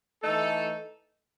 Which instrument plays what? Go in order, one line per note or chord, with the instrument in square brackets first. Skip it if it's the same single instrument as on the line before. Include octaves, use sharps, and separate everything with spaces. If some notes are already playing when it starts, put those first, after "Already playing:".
[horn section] E3 A3 D#4 A4